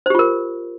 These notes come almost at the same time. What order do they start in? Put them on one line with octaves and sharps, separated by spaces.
C5 G4 F4 A#4